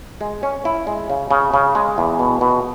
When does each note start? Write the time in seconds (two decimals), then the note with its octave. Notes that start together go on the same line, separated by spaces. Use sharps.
0.21 G#3
0.43 C#4
0.65 E4
0.87 G#3
1.10 C#3
1.31 C#3
1.54 C#3
1.75 G#3
1.98 E2
2.19 B2
2.41 B2